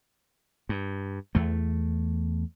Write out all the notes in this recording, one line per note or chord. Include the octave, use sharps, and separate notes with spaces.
G2
E2 A3